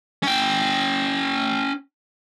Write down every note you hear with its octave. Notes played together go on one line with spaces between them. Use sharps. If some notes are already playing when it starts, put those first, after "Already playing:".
C#4 G5